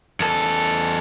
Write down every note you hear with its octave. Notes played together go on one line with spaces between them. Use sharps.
E2 A4